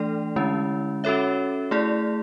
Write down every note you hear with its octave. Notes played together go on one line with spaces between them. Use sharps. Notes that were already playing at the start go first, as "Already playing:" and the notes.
Already playing: E3 A3 D4 A4 D5
D3 G#3 C#4 E4
C#4 F#4 A4 C#5 E5
A3 E4 G#4 D5